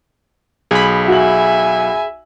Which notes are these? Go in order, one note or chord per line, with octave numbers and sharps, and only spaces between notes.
B1 G#4 B5
F#4 E5 G#5 F#7